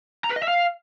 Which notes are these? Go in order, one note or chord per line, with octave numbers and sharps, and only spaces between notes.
A#5
B4
D#5
E5
F5